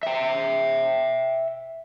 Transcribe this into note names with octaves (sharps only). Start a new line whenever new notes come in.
E5 G5